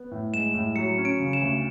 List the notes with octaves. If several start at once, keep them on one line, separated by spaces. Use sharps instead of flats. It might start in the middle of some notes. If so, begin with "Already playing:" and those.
Already playing: B3
A2
G#3 E7
A2
F#3 C#7
C#4
D7
C#3
E7
D2